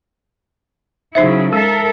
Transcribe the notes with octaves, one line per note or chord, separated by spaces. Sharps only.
C#3 F#3 D#4 E4 C5 E5
G#3 A4 A#4 E5